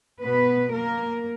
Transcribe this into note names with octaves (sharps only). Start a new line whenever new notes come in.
B2 B3 B4
A#3 A#4